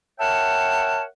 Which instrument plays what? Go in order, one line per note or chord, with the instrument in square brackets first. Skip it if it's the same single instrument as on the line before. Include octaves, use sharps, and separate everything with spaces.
[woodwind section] A#4 C#5 E5 F#5 G5 A5